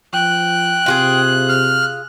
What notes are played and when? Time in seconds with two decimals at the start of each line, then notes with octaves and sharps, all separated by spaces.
0.13 F3 G5 F#6
0.86 C3 F4 F#4 G#4
1.49 F6